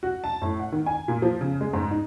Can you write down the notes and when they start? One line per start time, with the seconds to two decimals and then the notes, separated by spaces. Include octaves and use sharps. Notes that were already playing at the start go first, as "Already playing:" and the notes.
0.03 F#4
0.24 A5
0.42 A2
0.59 F#5
0.72 D#3
0.86 G#5
1.08 A#2
1.22 F3
1.41 C#3
1.61 G#3
1.73 G#2
1.91 D#4